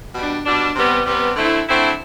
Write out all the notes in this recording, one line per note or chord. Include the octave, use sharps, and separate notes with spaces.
B2 G3 D4
B2 G3 D4
C3 G3 B3
C3 G3 B3
D3 A3 C4 E4
D3 A3 C4 E4